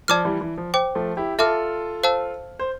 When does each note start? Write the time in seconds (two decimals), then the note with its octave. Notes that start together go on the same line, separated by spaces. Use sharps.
0.08 F3 D5 A5 D6 F6
0.25 E3 G3
0.41 E3
0.58 F3
0.74 C5 G5 D6
0.95 F3 A3
1.17 E4 G4
1.38 F4 A4 E5 A5 D6 F6
2.03 C5 F5 A5 E6
2.59 C5